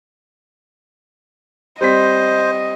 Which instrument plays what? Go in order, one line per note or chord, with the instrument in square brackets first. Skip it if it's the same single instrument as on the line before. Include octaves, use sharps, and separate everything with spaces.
[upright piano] G3 C4 B6 [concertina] C5 [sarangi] D#5